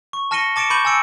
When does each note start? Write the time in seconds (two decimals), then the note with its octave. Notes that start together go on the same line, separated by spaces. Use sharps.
0.13 C#6
0.31 A5 F6 A#6 C#7 D#7 G7
0.56 A5 D6 A6 C#7 D7 E7
0.70 B5 C#6 D6 G6 D#7 F#7
0.85 G#5 A5 E6 C#7 D7